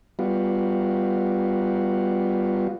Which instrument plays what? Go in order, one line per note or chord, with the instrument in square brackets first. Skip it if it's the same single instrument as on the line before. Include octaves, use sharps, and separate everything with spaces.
[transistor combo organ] G3 B3 F4 F#4